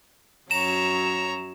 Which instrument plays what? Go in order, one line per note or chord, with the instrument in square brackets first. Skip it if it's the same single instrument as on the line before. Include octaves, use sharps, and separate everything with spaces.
[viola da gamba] F#2 F#3 [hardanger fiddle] C#5 A#5 [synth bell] E7